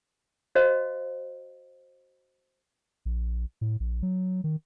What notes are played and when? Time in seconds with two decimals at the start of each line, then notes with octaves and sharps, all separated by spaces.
0.55 F#4 C5 D#5 F5
3.05 A#1
3.61 A2
3.80 A#1
4.03 F#3
4.44 D#3